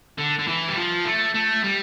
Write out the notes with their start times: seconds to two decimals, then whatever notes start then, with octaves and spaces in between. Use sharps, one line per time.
0.18 D3
0.39 D3
0.47 E3
0.68 G3
0.76 F3
1.05 A3
1.34 A3
1.64 G3